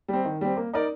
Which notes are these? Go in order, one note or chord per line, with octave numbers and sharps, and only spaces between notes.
G3 C4
D#3
G3 C4
A#3
D#4 A#4 D5